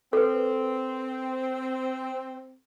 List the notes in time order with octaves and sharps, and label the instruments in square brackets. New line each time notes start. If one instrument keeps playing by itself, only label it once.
[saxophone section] C4 [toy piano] A4 B4